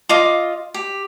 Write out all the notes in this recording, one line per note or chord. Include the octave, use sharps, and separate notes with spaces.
F4 D#5 D6
G4